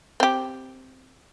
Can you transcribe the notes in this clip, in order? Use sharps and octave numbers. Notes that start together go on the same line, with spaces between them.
C4 G4